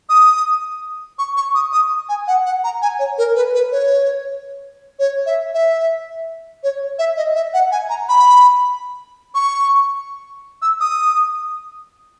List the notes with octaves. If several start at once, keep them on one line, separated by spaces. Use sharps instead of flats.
D#6
C#6
C#6
D#6
D#6
G#5
F#5
F#5
A#5
G#5
C#5
A#4
B4
B4
C#5
C#5
E5
E5
C#5
E5
D#5
E5
F#5
G#5
A#5
B5
C#6
E6
D#6